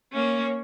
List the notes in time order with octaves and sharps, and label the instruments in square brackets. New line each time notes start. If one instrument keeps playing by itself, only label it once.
[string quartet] A#3 C#4